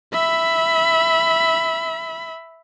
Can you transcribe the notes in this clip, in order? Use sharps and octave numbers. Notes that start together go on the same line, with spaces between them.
E5 B5